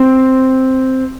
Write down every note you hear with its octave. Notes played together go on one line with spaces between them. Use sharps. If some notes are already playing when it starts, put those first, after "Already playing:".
Already playing: C4